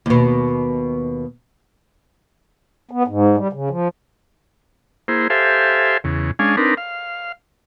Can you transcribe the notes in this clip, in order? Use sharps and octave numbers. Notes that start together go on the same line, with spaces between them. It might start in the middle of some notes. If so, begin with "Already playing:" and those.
D#2 B2
B3
G#2
G3
C#3
F3
A#3 E4 G#4 C5
G4 A4 C5 E5 F5 G#5
E2 C#3
G#3 C#4 D4 F5 G#5
C4 D4 D#4 A#4 B4
F5